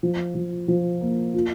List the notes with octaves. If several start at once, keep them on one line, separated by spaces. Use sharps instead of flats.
F3
F3
F3
A#3
F4